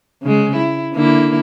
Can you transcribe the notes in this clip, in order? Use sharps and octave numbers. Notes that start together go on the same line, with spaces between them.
C#3 G#3
E4
D3 A#3 E4